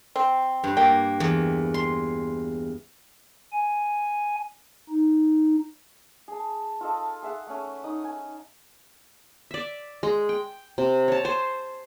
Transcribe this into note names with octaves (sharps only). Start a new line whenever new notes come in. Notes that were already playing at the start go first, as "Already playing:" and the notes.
C4
G2
A#3 G5
E2
C6
G#5
D#4
G#4 A5
F4 A4 D#5
G#4 E5 F#5
A3 C#4
D#4 D#6
G#5
D5 E5
G#3
G5
C3
C#5 A5
C5 G#5 A5